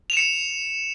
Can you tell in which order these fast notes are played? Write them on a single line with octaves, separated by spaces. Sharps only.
F7 E7 C#7